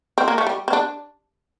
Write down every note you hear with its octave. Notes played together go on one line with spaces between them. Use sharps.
C4
A#3
A3
G3
C4
D4